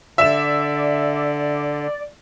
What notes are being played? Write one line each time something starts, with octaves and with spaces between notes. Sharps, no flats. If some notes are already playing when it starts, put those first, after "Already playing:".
D3 D5 E5 E7